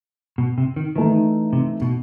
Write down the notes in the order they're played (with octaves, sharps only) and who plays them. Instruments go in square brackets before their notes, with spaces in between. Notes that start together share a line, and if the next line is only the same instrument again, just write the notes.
[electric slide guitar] B2
C3
D#3
[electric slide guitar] D#3 [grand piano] E3 A3 D#4
[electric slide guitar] C3
B2